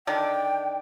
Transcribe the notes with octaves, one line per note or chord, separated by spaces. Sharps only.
D3 D#3 D4 G5